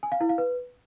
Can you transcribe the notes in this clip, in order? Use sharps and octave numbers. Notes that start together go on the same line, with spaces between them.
G#5
F5
E4
F5
B4